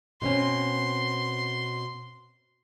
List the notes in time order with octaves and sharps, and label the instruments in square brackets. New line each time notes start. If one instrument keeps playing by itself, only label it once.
[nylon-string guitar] B2 C4 C#4 [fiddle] C6